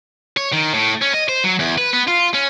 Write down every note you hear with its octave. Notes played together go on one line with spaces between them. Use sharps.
C#5
D#3
A2
C#4
D#5
C5
F#3
E2
B4
B3
F4
C#4